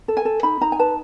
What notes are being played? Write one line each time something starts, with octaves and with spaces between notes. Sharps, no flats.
A4
G#5
A4
D#4 B5
D#4 A#5
G#5
B4 A5